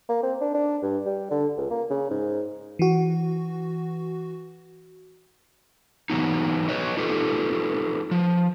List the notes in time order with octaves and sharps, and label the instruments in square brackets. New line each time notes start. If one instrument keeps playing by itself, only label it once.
[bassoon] A#3
C4
D4
D4
G2
G3
D3
C#2
A#3
C#3
G#2
[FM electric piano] E3 F#4
[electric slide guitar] E3 F#3 B3 D#4
F#4 B4 C#5 D#5
D#4 F4 G4 A4 B4
F3